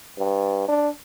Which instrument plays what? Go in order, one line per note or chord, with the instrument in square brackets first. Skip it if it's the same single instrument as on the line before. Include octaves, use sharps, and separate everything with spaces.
[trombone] G2
D4